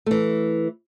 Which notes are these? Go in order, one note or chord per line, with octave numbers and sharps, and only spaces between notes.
E3 A3